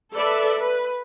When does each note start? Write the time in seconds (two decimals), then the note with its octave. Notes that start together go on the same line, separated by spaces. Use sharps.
0.14 A4 B4 D5 E5
0.59 B4